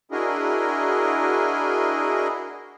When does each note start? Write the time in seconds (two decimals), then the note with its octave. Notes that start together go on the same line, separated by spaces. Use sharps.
0.11 D4 E4 F#4 G#4 A#4 D#5